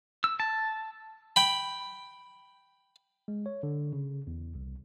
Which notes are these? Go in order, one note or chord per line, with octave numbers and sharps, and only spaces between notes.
E6
A5
G5 B5
G#3
C#5
D3
C#3
E2
C2